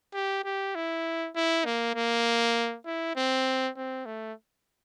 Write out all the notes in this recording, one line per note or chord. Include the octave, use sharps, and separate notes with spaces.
G4
G4
E4
E4
A#3
A#3
E4
C4
C4
A3